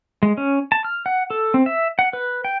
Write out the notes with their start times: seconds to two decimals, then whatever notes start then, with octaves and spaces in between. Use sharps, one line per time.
0.23 G#3
0.37 C#4
0.72 A5
0.84 F6
1.06 F#5
1.30 A4
1.54 C4
1.66 E5
1.99 F#5
2.13 B4
2.45 G5